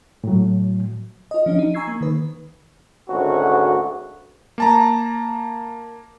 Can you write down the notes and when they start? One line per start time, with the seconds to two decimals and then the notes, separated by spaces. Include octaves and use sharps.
0.24 A2 F#3
1.31 F4 D#5
1.46 F3 C#4 D4 D#5
1.59 D#4
1.74 G#5 A#5 C#6 E6 G#6 C7
1.87 A#3
2.01 D#3 B4
3.09 G#1 D2 C#3 F#4
4.58 A#3 A5 A#5